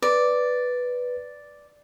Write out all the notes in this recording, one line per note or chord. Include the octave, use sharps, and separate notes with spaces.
B4 D5